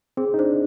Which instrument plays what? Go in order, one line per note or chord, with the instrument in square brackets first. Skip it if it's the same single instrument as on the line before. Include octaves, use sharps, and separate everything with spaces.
[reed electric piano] C4 [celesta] G#4
[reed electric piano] D#4
[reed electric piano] D4 [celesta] C5